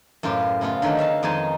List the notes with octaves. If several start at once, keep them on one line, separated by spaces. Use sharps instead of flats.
F#2 A2 F4 G4 B4 A5
C#3 A3 B3 F4
D3 D#3 F#3 A3 C#4
F#4 E5 F5 A5
F2 D#3 G#3 D#4 G#5 A5